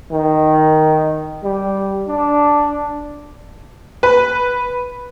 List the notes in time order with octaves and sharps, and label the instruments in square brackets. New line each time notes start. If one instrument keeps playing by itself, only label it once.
[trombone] D#3
G3
D4
[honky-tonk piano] B4